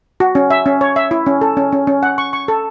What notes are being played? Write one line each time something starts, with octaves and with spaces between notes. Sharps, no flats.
F#4
C#4
E5
C#4
C#5
E5
E4
C#4
A4
C#4
C#4
C#4
F#5
C#6
C#6
A4